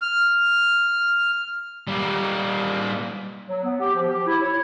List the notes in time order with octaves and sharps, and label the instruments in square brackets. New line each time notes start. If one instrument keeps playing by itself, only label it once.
[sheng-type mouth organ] F6
[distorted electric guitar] G3 A#3
[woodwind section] F#3
B3
G4
F3
G4
E4
C#5